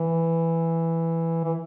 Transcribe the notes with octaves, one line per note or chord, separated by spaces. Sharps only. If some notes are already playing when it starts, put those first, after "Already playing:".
Already playing: E3
E3